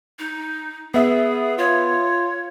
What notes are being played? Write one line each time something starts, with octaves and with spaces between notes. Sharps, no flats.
D#4
B3 G#4 E5
F4 C#5